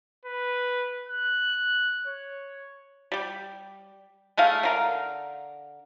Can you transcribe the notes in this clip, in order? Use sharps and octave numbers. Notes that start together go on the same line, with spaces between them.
B4
F#6
C#5
G3 G4
G#3 A3 D#4 F5
D3 A#4 F5